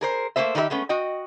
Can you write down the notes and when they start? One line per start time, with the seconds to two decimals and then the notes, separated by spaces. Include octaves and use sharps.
0.01 G#4 A#4 C5
0.36 A3 A#3 C#4 D#4 C5 E5
0.55 D#3 D#4 G4 A#4 E5
0.70 G#3 A3 B3 C#4
0.89 F#4 D#5 G5